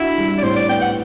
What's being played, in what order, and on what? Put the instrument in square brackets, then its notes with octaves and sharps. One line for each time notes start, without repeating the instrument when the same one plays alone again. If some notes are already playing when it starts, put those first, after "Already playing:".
Already playing: [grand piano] D4 F#4 [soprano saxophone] E4
[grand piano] G3
[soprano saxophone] D5
[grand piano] A2 [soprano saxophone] C5
[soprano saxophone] D5
[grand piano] B3 [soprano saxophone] G5
[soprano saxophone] F#5